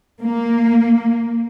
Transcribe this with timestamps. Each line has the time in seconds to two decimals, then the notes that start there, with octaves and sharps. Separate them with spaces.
0.20 A#3